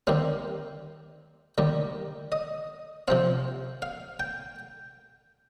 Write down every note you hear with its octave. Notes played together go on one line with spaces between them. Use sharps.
D#2 D#3 G3 C4 F5
D#2 D#3 G3
D#5
C3 F3 C4 F5
F5
G5